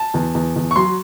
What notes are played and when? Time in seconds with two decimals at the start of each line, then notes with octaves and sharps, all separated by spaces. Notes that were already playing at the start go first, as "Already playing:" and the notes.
Already playing: A5
0.14 E2
0.35 E2
0.56 E2
0.71 C#6
0.76 F#3 C6